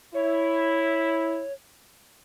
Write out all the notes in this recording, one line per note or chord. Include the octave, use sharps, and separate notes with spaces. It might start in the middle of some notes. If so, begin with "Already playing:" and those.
E4 C#5